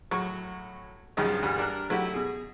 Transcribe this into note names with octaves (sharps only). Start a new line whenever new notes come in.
A2 F#3 C#6
C#2 G2 D#3 F3 F#3 G#3
D2 G2 E3 G3 F6
G3 D4 A#4 F#6
F#3 A3 E4 F#4 G4
B2 G#4